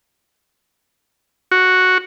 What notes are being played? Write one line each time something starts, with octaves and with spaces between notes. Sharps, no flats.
F#4